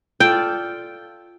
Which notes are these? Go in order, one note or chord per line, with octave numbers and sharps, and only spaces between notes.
F4 A4 D5 G5